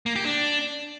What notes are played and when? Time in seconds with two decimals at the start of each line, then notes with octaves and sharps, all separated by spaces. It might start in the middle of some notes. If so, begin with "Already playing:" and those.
0.06 A#3
0.16 G4
0.25 D4